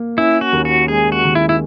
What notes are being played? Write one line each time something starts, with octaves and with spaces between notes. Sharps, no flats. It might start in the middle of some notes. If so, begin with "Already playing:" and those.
Already playing: A#3
C#4 E4
F#4
D#2
F#4
G#3 G#4
F#4
D#3
E4
E4